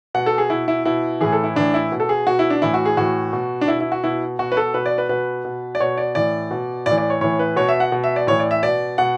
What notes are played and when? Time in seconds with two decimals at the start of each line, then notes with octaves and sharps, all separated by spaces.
0.14 B2 F#5
0.26 A4
0.38 G#4
0.50 B2 E4
0.68 E4
0.85 B2 E4
1.21 A2 E3 G#4
1.33 A4
1.44 E4
1.56 A2 E3 D4
1.74 E4
1.92 B2
2.00 A4
2.09 G#4
2.27 B2 F#4
2.39 E4
2.50 D4
2.62 A2 E3 E4
2.74 F#4
2.85 G#4
2.97 A2 E3 F#4
3.33 B2
3.61 D4
3.68 B2 E4
3.80 E4
3.92 F#4
4.04 B2 E4
4.39 B2 F#4
4.52 B4
4.57 A4
4.74 B2 B4
4.86 D5
4.98 B4
5.09 B2 B4
5.45 B2
5.75 D5
5.80 B2 C#5
5.97 D5
6.15 A2 E3 D5
6.51 B2
6.86 A2 E3 D5
6.98 D5
7.10 C#5
7.21 A2 E3 C#5
7.39 B4
7.56 B2 C#5
7.68 E5
7.80 F#5
7.92 B2
8.04 E5
8.16 D5
8.27 A2 E3 C#5
8.40 D5
8.51 E5
8.63 B2 D5
8.98 B2 F#5